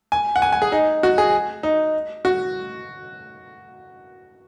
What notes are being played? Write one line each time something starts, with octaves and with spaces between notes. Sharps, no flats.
G#5
F#5
G#5
G#5
G#4
D#4
F#4
G#4
D#4
F#4